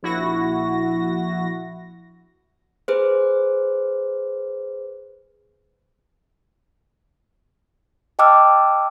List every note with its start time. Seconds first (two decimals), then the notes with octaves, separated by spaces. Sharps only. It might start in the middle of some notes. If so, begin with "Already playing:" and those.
0.03 A#1 E4 F#4 A#6
2.88 G#4 B4 C5
8.19 D#5 G5 A5 D6 E6 F6